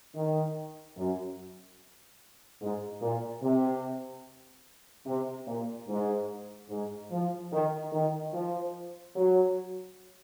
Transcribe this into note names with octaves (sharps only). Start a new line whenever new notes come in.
D#3
F#2
G#2
A#2
C3
C3
A#2
G#2
G#2
F3
D#3
D#3
F3
F#3